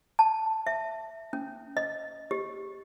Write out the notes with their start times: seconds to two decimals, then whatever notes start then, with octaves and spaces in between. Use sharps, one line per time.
0.19 A5
0.67 E5
1.33 C#4
1.77 D#5
2.31 G4